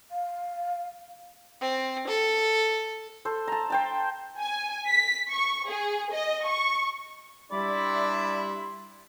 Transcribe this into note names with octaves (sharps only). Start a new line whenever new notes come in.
F5
C4
A4
A4 C5
A5 A#5
C5 G5 A5
G#5
B6
C#6
G#4
D#5
C#6
G3 D4 E4 D5 E5 B5 C6